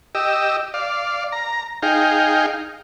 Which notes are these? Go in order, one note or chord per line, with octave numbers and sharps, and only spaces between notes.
G4 D#5 E6
D5 F5
A#5
D#4 G#4 F5 G5